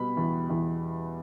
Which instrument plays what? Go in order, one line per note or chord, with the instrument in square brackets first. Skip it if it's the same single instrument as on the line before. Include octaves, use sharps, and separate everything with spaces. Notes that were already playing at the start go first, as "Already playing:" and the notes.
Already playing: [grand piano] B2 G3 B5
E2
E2